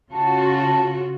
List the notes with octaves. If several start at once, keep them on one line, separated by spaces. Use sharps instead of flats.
C#3 F4 F#4 A5